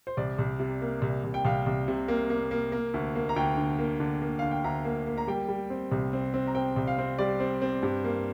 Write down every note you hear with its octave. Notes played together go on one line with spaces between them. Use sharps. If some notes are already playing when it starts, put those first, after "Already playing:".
C5
C2 D5
C2
C3
A#3
C2
C2
G5
C2 F5
C2
C3
A#3
A#3
A#3
A#3
D2
A#3
A#5
D2 G5
D3
A#3
D3
A#3
D3 F5
G5
D2 A#5
A#3
A#3
A#5
G3 G5
G3
C4
C2
C4
C4
A#5
C4 G5
C2
F5
C4
G3 D5
C4
C4
G2
A#3